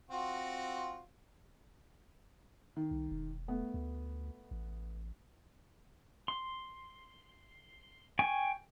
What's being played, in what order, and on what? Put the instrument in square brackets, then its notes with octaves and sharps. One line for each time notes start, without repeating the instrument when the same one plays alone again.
[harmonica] C4 F4 F#4
[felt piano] D#3
[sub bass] C2
E1
[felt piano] A3 B3
[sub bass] D2
A1
[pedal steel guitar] C6
G5 G#5 C#6